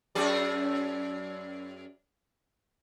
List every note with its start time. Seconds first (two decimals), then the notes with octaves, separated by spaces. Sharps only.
0.15 F#2 G#4 D5